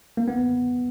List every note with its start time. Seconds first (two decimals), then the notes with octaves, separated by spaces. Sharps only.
0.17 A#3
0.28 B3